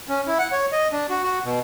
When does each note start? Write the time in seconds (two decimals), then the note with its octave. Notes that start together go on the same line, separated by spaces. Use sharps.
0.09 C#4
0.27 E4
0.39 F#5
0.52 C#5
0.72 D#5
0.92 D4
1.09 F#4
1.24 F#4
1.44 B2